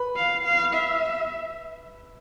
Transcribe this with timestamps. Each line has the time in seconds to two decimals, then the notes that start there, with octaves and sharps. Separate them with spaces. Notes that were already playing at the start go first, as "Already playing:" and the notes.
Already playing: B4 B5
0.16 F5
0.44 F5
0.74 E5